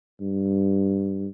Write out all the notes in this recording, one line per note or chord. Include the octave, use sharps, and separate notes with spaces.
G2